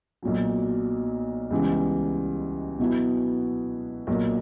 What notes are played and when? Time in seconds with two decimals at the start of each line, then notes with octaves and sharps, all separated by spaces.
0.23 B1 A#2 F#3
1.51 C#2 C#3 E3 G3 B3
2.79 B2 F#3 B3 E4
4.07 B1 A#2 A#3